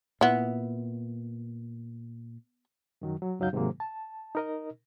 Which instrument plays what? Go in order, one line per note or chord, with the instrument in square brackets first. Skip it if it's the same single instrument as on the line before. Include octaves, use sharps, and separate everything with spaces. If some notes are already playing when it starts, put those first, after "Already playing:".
[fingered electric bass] A#2 [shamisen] B3 E4
[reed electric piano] F#2 D#3 F#3
F#3
C#2 F#2 F#3 D#4 F5 G6
G#2 C3 D#3 F#3 G#3 A#3
A5
D#4 A#4 D#5